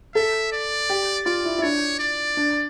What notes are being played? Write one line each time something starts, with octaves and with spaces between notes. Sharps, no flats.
A4 E5
D5
G4
F4 D5
E4
E4
D4 C#5
D5
D4